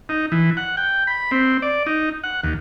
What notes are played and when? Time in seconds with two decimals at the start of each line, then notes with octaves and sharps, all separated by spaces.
0.09 D#4
0.32 E3
0.57 F#5
0.77 G5
1.07 B5
1.31 C4
1.62 D5
1.87 D#4
2.24 F#5
2.44 D#2